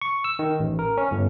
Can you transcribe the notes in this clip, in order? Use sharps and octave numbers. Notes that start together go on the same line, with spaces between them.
C#6
E6
D#3
A1
A#4
C#4
G1